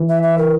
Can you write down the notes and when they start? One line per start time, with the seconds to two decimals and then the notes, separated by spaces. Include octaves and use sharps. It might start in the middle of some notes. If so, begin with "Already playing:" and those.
Already playing: E3
0.09 E5
0.23 E5
0.38 A#4